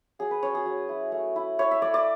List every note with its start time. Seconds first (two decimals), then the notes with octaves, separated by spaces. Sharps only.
0.19 F#3 G#4
0.31 B4
0.42 C#4 C#5
0.55 G#4
0.66 F#3
0.89 E4
1.12 A3
1.36 E4
1.59 E4 C#5
1.71 E5
1.82 A3 D5
1.94 D5